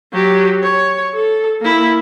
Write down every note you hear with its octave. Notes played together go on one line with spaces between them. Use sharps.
F#3 G4
C#5
A4
A#3 E4